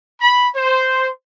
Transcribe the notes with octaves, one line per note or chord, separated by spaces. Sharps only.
B5
C5